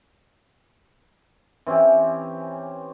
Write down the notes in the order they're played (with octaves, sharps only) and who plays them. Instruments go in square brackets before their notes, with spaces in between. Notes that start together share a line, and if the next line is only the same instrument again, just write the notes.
[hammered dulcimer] E3 C4 C#4 G4